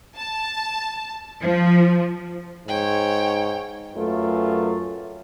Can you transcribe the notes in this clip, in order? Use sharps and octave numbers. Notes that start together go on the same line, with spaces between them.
A5
F3
G#2 C#5 G5
F#2 A3 F4 B4